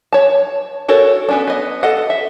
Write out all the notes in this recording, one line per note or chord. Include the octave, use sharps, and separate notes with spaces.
C#5 A5
F#4 A4 A#4 C#5
B3 C#4 D4
B3 D#5
A4 D#5 F#5
E5